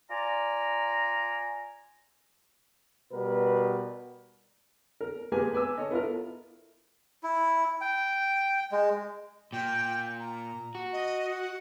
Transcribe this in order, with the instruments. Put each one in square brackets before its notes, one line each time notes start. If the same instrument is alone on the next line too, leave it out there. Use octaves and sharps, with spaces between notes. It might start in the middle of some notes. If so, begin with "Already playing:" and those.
[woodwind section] F4 D5 G#5 A#5
[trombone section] B2 G3 A#4 B4
[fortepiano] A#4
G#3 A#3 G4 G#4 B4 G#5
B4 G#5 D6 E6
A4 C#5 D#5
B3 E4 F4 A4 A#4
[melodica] E4
G5
G#3
[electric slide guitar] A#2 [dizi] G5
[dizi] A#5
[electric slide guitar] F#4
[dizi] D#5
F#5